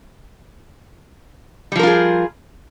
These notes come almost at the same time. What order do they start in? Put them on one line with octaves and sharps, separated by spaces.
G3 F3 A#4 F4 G#4